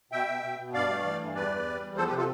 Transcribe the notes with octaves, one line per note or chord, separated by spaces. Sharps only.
B2 E5 G5
B2
B2
B2
G2 D5 F5
A3
E3
G2
E2 B4 D5
E2
G3
E2
F3 A4 C5
G4 B4
C3
F4 A4